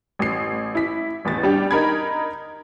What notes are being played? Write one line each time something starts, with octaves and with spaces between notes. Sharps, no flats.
A1 C7
E4 B6
A1 E2 A6
G3 D4 G4
D#4 A#4 B5 G#6